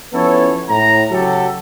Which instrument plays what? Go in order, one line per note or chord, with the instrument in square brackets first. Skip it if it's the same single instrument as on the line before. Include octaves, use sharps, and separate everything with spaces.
[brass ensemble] F3 B3 C#4 E4 A4 C#5
A2 A#5
C#3 F#3 F#4 G4 A4